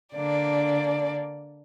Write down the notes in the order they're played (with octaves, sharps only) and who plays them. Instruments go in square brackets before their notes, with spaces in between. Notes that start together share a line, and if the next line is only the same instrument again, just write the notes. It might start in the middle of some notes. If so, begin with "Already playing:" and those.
[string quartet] D3 A#3 D4 [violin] D5